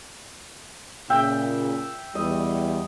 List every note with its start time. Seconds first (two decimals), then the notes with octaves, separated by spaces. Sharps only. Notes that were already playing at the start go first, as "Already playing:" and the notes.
1.10 A#2 C#3 E5 G5
2.15 E2 G3 D#5